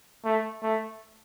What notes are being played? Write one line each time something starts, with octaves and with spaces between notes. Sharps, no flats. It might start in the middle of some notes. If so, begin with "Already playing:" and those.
A3
A3